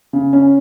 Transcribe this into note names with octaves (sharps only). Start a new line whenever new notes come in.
C#3
C#4